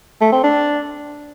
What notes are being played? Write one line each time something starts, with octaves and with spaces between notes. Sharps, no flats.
A3
C4
D4